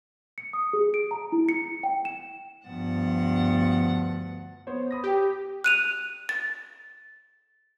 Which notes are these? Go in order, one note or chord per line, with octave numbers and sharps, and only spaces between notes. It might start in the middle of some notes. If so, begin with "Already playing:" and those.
C#7
D#6
G#4
D7
A#5
E4
C#7
G5
E7
D2 G2 F3 B3 F#5 A6
B3 C5 C#5
B5 D#6 A#6
G4
F#6 D#7 F7
A6